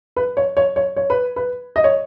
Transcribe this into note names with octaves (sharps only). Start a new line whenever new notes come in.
B4
C#5
C#5
C#5
C#5
B4
B4
D#5
C#5